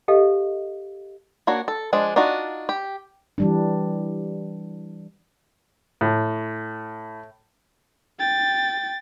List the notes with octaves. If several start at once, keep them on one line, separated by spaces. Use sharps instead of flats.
G4 A4 D#5 F5
A#3 D4 F#4 C#5
A4
F3 G#3 D4
D4 D#4 F4 F#4
G4
E3 G3 D4
A2
G5 A6